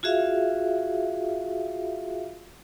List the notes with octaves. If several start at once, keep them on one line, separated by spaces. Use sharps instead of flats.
F4 F#4 G#4 E5 F5